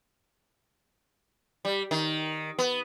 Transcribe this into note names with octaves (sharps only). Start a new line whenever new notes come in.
G3
D#3
B3